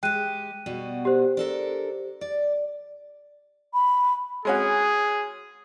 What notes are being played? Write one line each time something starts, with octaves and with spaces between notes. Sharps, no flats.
G#3 G4 G5 F#6 D#7
B2 G3 F#4
G4 C5
D4 A4 A#4
D5
B5
G#3 C#4 F#4 G#4